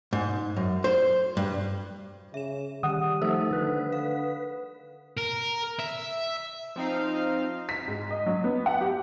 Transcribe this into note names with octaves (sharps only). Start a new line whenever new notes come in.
G#2
F#2
C5
G2
C#3 E5 E7
D#3 G3 F#5 D#6
F3 A3 D#4 A4 C5
D3 B4
F5
A#4
E5
F3 C4 D#4 F5
B6
G#2
D#5
F#3
B3
F#5
G4